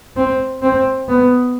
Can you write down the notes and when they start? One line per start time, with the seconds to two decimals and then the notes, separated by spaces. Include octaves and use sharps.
0.16 C4
0.62 C4
1.09 B3